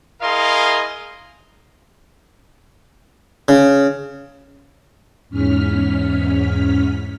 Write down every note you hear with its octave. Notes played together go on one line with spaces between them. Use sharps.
E4 G#4 A#4 D#5 F5 C6
C#3
E2 G#2 C#4 F6 B6